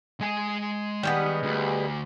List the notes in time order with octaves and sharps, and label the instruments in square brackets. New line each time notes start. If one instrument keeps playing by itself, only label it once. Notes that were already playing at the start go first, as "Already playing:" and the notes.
[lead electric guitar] G#3 G#5
[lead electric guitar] D#3 [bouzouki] G3 G#3 B3
[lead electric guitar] D2